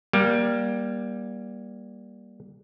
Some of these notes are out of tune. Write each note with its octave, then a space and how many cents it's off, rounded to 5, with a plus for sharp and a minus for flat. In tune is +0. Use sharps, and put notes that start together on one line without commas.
G3 +0 A#3 +25